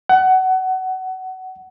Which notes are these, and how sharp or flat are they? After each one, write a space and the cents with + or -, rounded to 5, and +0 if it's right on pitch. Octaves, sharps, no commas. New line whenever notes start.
F#5 +20